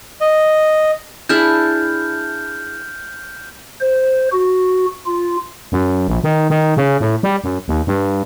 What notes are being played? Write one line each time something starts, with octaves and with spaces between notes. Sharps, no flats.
D#5
D4 E4 G#4 F6 G6
C5
F#4
F4
F#2
A#1
D#3
D#3
C#3
A2
G3
F#2
D#2
G2